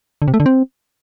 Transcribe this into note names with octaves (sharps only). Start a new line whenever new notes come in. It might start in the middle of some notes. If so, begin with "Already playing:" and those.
D3
C3
A3
D3
C4